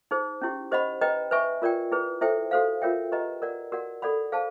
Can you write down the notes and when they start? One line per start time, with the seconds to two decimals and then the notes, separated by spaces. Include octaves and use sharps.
0.11 D#4 G#4 C5
0.41 C#4 E4 G4
0.71 G4 C5 D#5 F#5 B5
1.01 B4 D#5 G5 A#5
1.31 B4 E5 G#5 C#6
1.62 F4 A#4 D5 G5
1.92 E4 G#4 B4
2.21 E4 A4 C5 E5 G5
2.51 F#4 A4 C5 F5
2.82 F4 A#4 C#5 E5 G5
3.12 G4 B4 D#5 G5 A#5
3.42 A#4 D5 F#5
3.72 F#4 A#4 D5 F#5
4.02 A4 D5 F#5 B5
4.32 G#4 C5 F5 A5